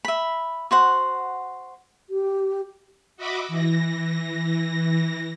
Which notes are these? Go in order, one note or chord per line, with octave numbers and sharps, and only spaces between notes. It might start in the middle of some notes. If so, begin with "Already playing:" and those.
E5 B5
F#4 C5 F#5
G4
F#4 D#5 E5 B5 D6
E3 A#6